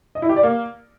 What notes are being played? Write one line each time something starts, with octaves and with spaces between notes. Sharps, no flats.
D#5
E4
G4
D5
A#3